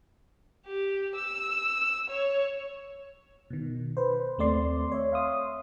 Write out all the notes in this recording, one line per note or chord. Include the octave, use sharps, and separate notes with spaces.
G4
E6
C#5
B2 D#3
B4 C5
D#2 A3 C4 D5 C6
C#5 E5
E5 F5 C6 D#6